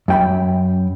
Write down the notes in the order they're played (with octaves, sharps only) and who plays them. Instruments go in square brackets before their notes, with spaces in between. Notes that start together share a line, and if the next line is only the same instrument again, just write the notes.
[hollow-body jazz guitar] F#2 G5 B5